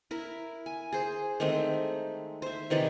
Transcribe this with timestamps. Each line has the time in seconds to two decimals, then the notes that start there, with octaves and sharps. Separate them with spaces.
0.11 E4 A#4
0.66 G#5
0.92 G#4 C5
1.40 D#3 G#3 A3 C4
2.42 C5 E5
2.70 C3 D#3 E3 D5